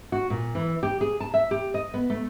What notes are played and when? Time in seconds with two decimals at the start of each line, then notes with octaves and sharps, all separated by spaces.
0.12 F#4
0.30 A#2
0.55 E3
0.83 G4
1.01 G#4
1.20 A5
1.34 E5
1.51 G4
1.74 D#5
1.94 B3
2.10 A3